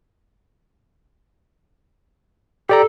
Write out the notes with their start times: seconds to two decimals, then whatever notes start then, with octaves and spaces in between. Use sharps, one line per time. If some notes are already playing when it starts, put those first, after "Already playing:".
2.69 G4 A4 D5 A#5